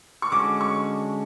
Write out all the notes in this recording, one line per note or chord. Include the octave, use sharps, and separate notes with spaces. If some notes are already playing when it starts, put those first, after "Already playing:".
C#6
D3 G#3 C#4 F#4 D6
C#6